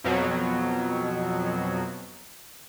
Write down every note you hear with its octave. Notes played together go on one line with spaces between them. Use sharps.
F2 B2 F#3